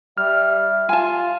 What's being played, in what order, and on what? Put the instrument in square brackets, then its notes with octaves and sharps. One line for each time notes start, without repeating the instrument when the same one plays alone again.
[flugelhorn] G3 [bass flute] E5 [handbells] F6
[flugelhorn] F4 [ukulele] G#5 A5